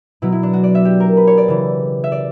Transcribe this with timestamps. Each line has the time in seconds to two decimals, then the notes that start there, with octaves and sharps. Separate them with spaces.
0.22 B2 F#3 E4
0.32 E4
0.43 D4
0.53 F#4
0.64 D5
0.75 E5
0.85 G4
1.00 A#4
1.17 B4
1.27 C#5
1.38 D5
1.48 C#3 E3
2.04 E5
2.12 D5